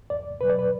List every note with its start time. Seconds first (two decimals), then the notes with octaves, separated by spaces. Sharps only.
0.10 E2 D5
0.40 B2 F#3 B4
0.50 D5
0.59 B4